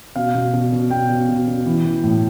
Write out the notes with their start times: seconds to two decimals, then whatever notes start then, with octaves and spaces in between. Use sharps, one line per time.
0.16 B2 F5
0.35 B2
0.53 B2
0.72 B2
0.90 B2 G5
1.10 B2
1.29 B2
1.47 B2
1.66 E3
1.85 E3
2.04 A2